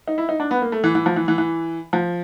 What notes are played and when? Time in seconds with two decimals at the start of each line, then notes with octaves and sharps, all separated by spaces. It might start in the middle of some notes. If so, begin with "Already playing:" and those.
0.08 D#4
0.18 E4
0.29 D#4
0.40 D4
0.51 B3
0.62 A#3
0.72 A3
0.84 E3
0.95 E3
1.06 F3
1.16 E3
1.28 E3
1.38 E3
1.93 F3